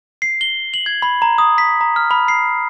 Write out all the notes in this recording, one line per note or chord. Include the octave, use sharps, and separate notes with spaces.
C7
G7
F#7
G#6
B5
A#5
D#6
B6
A#5
F6
B5
C7